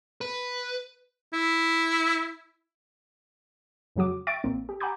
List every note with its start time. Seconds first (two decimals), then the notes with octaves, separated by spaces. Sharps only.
0.21 B4
1.33 E4
3.96 F2 C#3 F#3 F#4 D6
4.27 E5 G5 C#6 A6 D7
4.44 A1 A#3 C4
4.69 G4
4.80 F#5 G#5 A#5 B5 D6 G6